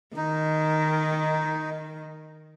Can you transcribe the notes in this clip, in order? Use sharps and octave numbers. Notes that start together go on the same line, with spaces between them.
D#3 D#4